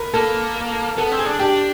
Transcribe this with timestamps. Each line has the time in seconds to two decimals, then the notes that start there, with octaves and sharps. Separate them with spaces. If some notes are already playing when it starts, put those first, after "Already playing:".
Already playing: A#4 B4
0.14 A#3 A4
0.97 B3 A4
1.12 C4
1.19 G#4
1.26 D4
1.39 D4 G4